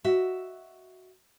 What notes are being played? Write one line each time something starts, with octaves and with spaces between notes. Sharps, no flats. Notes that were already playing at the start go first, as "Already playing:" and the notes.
F#4 D#5 E5